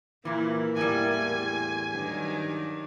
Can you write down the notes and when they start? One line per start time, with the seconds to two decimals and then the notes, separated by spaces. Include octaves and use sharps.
0.25 A#2 E3 A#3 E4
0.77 E2 A2 G3 G#5
1.92 G2 D#3 F#3 D4